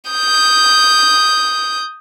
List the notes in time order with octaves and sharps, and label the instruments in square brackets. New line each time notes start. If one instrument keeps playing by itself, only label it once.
[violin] D#6 G6